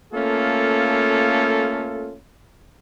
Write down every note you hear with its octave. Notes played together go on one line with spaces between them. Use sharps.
A3 A#3 C#4 F4 A4